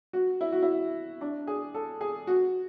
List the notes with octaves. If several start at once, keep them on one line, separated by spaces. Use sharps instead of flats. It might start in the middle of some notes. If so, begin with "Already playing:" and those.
F#4
E4
F#4
E4
D4
G#4
A4
G#4
F#4